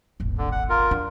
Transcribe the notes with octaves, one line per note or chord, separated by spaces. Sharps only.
D#1 G#1
D3
F#5
F4 A#4
D4